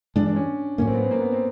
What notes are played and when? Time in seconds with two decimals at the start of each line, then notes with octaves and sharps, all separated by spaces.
0.16 G2 E3 G#3 D4
0.26 D4
0.36 C#4
0.78 A2 F#3 A#3 C#4
0.87 C4
0.95 B3
1.03 C4
1.11 A#3
1.21 B3
1.32 C4